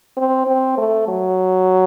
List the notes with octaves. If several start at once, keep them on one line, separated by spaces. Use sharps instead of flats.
C4
C4
A3
F#3